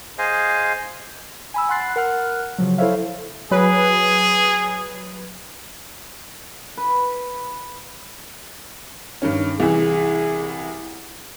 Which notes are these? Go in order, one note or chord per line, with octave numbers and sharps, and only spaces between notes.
G#4 C5 D#5 F5 G#5
G#5 B5 E6
F#5 B5 C6 F#6 A6 C7
A#4 F#5 F6 F#6
C#3 F3 F#3
E4 A4 C5 C#5 E5 F5
F#3 G#4 B4
B4
G2 D#3 C#4
C2 E3 G#4